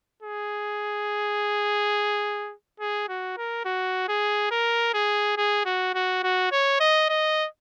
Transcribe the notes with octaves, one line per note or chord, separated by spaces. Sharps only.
G#4
G#4
F#4
A#4
F#4
G#4
A#4
G#4
G#4
F#4
F#4
F#4
C#5
D#5
D#5